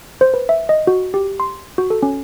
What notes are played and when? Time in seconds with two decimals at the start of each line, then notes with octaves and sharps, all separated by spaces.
0.21 C5
0.34 B4
0.49 E5
0.69 D#5
0.87 F#4
1.14 G4
1.40 C6
1.78 F#4
1.90 A4
2.03 C#4